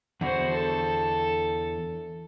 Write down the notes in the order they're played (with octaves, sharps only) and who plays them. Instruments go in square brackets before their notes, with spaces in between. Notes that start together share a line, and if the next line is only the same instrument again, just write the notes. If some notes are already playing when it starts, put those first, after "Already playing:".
[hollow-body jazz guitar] E2 D3 [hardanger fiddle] F#4 C5
[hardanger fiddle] A4